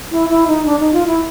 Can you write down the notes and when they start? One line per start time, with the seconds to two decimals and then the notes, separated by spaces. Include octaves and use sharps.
0.11 E4
0.30 E4
0.47 D#4
0.66 D4
0.80 D#4
0.93 F4
1.07 E4